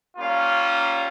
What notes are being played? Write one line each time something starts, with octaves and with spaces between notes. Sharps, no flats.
G3 A#3 C#4 F4 F5